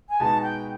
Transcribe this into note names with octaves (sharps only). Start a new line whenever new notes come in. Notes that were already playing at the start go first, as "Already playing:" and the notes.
G#5
B2 G#3 B3 D#4 F#4 A5
G5